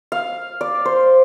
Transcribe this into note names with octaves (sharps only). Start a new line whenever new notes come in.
F5
D5
C5